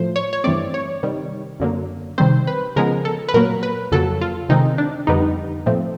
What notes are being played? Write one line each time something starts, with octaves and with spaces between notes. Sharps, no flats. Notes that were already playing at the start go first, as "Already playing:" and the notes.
Already playing: A2 F3 A3 C5
C#5
C#5
G2 E3 A3 C4 D5
C#5
C3 D#3 G3
F#2 D3 F#3 A#3
C3 D#3 G3 C4 C5
B4
C#3 F3 G#3 B3 A#4
A4
B4
A#2 F#3 A#3 A#4
B4
F2 C#3 F#3 A#3 A4
F4
C3 D#3 G#3 C4 D#4
D4
F2 D3 G3 B3 D#4
A#2 F3 A3 C4